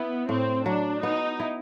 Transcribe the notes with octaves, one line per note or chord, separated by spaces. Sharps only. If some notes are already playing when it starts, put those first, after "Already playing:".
Already playing: B3 E4
A2 C4
F#3 D4
B3 D#4
E4